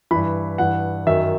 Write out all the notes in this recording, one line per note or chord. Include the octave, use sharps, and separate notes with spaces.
G2 E3 B5
G2 E3 F#5
F#2 D#3 E5